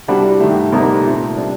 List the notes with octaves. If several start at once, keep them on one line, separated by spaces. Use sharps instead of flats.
C2 C3 G3 D4 F#4
G2 D#3 A3
D2 C3 G3 A#3 D#4
A#2 A3 C4
C3 G3 D4